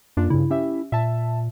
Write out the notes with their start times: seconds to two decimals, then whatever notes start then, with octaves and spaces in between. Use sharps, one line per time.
0.17 F#2 A#3 D4 F4
0.30 G2 C#3 E4
0.50 C#4 G4 E5
0.92 A#2 E5 A5